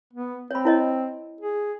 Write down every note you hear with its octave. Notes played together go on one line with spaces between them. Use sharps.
B3
C4 C#5 B5
E4 C#5 D#5
G#4